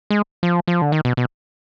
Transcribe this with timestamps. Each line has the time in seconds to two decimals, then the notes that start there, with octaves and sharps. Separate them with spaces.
0.10 G#3
0.43 F3
0.68 F3
0.82 D3
0.92 D#3
1.05 B2
1.17 B2